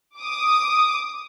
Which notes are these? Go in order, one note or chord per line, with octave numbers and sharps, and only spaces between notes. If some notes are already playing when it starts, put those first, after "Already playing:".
D6 D#6